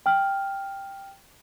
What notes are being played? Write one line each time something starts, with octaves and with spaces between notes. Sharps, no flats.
G5 F6